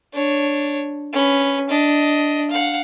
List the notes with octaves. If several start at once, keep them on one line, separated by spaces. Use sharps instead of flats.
D4 C#5
C#4 B4
D4 D#5
F5 F#5